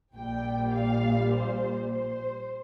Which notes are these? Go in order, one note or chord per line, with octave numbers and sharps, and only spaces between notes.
A#1 A#2 G3 G5
F5
C5
C5